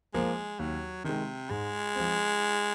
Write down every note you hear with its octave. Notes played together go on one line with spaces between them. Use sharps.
F3 G#3 A#3
D#2 F#3
C3 D#3 G#3
G#2 G#3
F3 C4